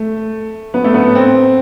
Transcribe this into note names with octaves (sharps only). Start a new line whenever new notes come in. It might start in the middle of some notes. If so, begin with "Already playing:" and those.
Already playing: A3
B3
A3
B3
C4